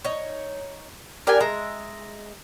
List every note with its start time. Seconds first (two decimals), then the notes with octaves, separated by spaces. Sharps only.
0.04 D#4 C#5
1.27 D4 G4 A#4 G5 G#5
1.40 G#3 E5 A#5